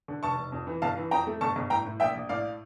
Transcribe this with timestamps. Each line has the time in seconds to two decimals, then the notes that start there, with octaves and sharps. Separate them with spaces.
0.08 D3
0.23 F1 A5 C#6
0.38 F1
0.52 F2
0.67 E3
0.82 G1 F5 A5
0.97 E3
1.11 F2 G5 A#5
1.27 A3
1.41 G1 A5 C#6
1.56 G1
1.70 A2 G5 A#5
1.85 A2
2.00 A#1 E5 G5
2.15 A#1
2.29 A2 D5 F5